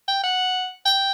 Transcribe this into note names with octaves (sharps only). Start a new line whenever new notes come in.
G5
F#5
G5